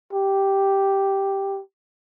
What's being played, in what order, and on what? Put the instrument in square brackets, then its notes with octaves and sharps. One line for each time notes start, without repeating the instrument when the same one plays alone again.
[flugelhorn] G4